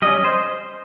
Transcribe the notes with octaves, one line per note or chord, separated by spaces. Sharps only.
G3 C#4 D#5
C5